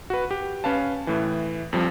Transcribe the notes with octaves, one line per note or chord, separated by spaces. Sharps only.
F#4 B4
G4
C#4 B4 F5 A5
A2 E3
F2 F3 G3